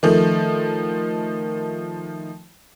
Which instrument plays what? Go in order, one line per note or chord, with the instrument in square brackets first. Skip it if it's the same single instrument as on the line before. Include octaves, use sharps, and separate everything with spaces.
[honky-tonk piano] D#3 F3 A3